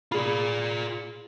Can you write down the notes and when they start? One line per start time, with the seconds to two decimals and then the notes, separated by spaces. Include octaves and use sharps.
0.12 F4 G#4 D5 B5